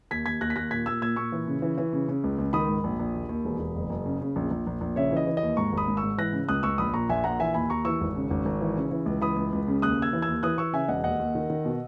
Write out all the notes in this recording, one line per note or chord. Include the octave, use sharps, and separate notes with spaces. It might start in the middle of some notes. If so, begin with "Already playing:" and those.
D#2 G#6 B6
D#2 G#6 B6
D#2 F#6 A#6
B6
D#2 F#6 A#6
A#2 G#6 B6
A#2 E6 G#6
A#2 E6 G#6
A#2 C#6 E6
E3
C#3
E3
E3
C#3
C#3
C#2
C#2
D#3 B5 D#6
G#2
A#1
A#1
D#2
D#2
E1
E1
F#1
F#1
C#3
C#3
A#1
A#1
A#1
A#1
C#3 C#5 E5
E3 D#5
E3
D#5
D#2
G#2 A#5 C#6
G#1 B5 D#6
G#2
C#6 E6
G#2
E3 F#6 A#6
C#3
C#2 D#6 F#6
C#2 C#6 E6
A#1 B5 D#6
A#2 A#5 C#6
A#1 E5 G#5
A#2 F#5 A#5
E3 E5 G#5
D#2 G#5 B5
D#2 A#5 C#6
E3 C#6 E6
G#1
C#3
G#1
G#1
E3
C#3
E3
C#2
E3 B5 D#6
C#2
C#2
C#3
D#2 D#6 F#6
D#2 E6 G#6
E3
E6 G#6
D#2
E3 D#6 F#6
E3 C#6 E6
C#3 E5 G#5
E1 D#5 F#5
D#2 D#5 F#5
D#2
D#3
D#3
B2